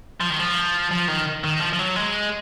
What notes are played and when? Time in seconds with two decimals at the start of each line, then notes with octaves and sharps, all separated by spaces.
0.20 F3
0.30 D#3
0.39 F3
0.91 F3
1.08 D#3
1.44 D#3
1.61 F3
1.73 F3
1.79 F#3
1.96 G#3